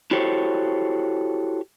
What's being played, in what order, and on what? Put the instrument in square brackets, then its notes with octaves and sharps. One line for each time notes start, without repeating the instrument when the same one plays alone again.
[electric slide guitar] E4 F#4 G4 A4 C5 C#5